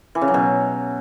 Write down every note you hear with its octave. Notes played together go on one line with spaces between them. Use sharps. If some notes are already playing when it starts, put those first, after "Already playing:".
E3
C#3
F#3
B2